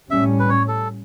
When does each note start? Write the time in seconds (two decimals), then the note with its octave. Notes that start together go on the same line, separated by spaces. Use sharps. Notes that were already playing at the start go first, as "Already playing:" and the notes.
0.10 A2 G3 C#4 E5
0.40 B4
0.49 C#5
0.68 A4